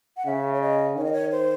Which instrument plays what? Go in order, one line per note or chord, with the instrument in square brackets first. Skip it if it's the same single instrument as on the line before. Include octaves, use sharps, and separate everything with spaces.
[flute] F#5
[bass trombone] C#3 [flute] E5
[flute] C#5
D#5
[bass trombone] D#3 [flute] C#5
[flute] D#5
C#5
C5